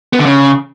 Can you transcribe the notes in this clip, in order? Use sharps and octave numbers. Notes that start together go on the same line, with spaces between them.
B3
D3
C#3